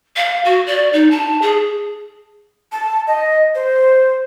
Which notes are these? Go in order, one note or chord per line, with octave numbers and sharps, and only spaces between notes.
F5
F#4
D5
D#4
A5
G#4
A5
D#5
C5